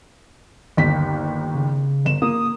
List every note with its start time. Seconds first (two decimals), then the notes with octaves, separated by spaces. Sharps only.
0.77 G1 D#2 B6
1.55 C#3
2.05 G1 E7
2.22 A#3 D#6